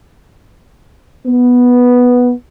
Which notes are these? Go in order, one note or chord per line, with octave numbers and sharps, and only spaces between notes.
B3